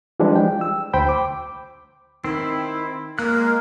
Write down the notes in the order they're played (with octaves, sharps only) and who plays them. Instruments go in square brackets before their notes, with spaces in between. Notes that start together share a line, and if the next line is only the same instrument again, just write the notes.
[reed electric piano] E3 F3 G3 G#3 D4
G5
E6
D2 C5 G5 B5
D6
[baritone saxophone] D#3 [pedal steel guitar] C4 E4
[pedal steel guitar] G#3 F#6 [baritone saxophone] A#3 [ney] A#4